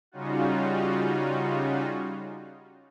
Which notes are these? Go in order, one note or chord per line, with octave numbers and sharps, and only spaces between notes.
C#3 G3 C#4 D#4 F4 F#4